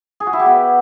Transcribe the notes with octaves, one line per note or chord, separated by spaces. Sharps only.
G#4
F#4
E4
G4
B3